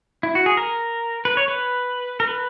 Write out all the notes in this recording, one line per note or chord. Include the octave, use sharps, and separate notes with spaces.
E4
F#4
G#4
A#4
B4
C#5
B4
A#4
B4